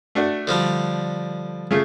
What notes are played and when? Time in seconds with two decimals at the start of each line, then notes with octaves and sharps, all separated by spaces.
0.15 A3 D4 F#4
0.47 D3 F3 G3
1.71 C#3 A3 F4